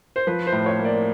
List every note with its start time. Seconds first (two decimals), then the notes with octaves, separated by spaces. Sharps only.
0.16 C5
0.27 F3 B4
0.47 C5
0.52 A2
0.66 C#5
0.79 A#3
0.85 D5